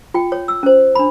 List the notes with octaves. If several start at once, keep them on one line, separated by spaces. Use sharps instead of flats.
F4 G5
C#5
E6
C#4 C5
D4 B5